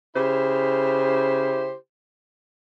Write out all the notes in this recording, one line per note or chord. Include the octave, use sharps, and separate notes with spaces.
C#3 E4 G4 C5